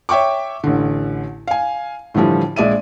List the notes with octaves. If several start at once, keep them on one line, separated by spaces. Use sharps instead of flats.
C#5 E5 G5 C#6 D6
A1 D3
F5 G#5
A2 D3 E3 F3 G3
A#1 G#3 D5 E5 D#7